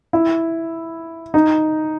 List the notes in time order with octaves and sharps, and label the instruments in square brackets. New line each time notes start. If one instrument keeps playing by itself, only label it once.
[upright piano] E4
D#4